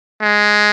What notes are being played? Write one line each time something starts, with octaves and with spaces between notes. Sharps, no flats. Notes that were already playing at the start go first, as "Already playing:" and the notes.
G#3